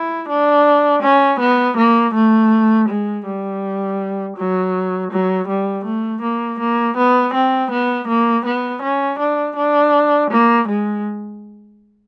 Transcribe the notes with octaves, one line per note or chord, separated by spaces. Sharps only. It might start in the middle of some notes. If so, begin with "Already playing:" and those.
Already playing: E4
D4
C#4
B3
A#3
A3
G#3
G3
F#3
F#3
G3
A3
A#3
A#3
B3
C4
B3
A#3
B3
C#4
D4
D4
A#3
G#3